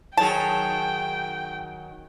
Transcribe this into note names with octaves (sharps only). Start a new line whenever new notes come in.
D#3 F#3 G#4 G5 A5